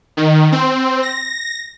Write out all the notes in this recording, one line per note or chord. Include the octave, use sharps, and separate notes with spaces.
D#3
C4
A#6